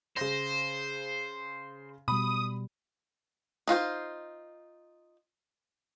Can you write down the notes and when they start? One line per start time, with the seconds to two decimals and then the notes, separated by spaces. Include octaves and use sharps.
0.17 C#3 C5 A#6
2.08 B2 G3 B5 D#6
3.67 D#4 F4 F#4 C5